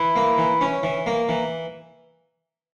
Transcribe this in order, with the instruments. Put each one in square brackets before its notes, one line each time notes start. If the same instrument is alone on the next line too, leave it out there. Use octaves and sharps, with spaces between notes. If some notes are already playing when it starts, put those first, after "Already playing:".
Already playing: [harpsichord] E3 [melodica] E4
[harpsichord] A#3
E3
C#4
E3
A#3
E3